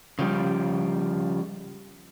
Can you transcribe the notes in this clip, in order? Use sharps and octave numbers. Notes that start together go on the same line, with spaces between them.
C#3 F3 G3